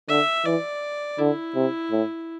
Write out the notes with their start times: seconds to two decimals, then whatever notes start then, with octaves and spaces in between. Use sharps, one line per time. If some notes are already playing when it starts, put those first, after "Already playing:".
0.09 D3 E5
0.45 E3 D5
1.19 D3 E4
1.55 C3
1.91 A2